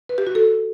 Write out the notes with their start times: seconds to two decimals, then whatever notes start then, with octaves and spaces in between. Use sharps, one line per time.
0.09 B4
0.18 G4
0.27 F#4
0.35 A4